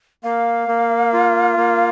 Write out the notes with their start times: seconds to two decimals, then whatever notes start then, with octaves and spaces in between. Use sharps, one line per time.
0.24 A#3 F5
0.68 A#3
1.13 F4
1.57 A#3